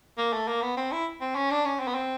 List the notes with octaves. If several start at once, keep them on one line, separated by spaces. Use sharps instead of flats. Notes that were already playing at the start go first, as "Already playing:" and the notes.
A#3
A3
A#3
B3
C4
E4
C4
C#4
D4
C#4
C4
B3
C4